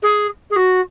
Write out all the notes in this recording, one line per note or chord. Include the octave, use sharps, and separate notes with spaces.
G#4
G#4
F#4